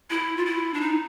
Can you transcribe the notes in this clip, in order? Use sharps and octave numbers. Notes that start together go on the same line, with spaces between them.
E4
F4
E4
D4
D#4